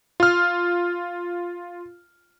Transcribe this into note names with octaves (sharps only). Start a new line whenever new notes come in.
F4 F6